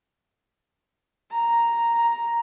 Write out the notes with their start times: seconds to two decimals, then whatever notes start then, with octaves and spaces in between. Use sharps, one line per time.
1.31 A#5
1.95 A#5